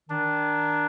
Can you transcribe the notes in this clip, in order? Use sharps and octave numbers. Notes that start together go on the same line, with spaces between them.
D#3 D4